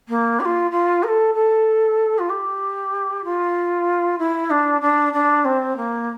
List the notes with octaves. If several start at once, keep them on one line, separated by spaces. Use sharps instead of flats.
A#3
G4
F4
F4
A#4
A4
A4
F4
G4
F4
E4
D4
D4
D4
C4
A#3